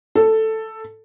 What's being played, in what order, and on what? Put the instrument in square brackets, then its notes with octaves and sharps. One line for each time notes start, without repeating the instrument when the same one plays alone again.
[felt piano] A4